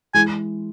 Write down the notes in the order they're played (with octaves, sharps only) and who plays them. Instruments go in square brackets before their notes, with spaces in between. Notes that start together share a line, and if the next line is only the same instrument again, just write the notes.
[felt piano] E3 G#3 [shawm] G#5